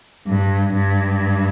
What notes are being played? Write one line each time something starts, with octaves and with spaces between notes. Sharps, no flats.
G2
G2